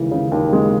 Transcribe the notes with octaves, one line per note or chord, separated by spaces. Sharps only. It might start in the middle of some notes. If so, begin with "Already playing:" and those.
Already playing: D#2 C#3 E3 G#3
C#3
D#2
G#3